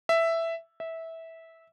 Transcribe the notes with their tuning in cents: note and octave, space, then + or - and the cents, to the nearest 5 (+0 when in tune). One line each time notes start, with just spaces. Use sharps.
E5 +5
E5 -15